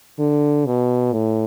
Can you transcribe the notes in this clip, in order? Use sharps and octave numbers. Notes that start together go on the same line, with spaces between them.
D3
B2
A2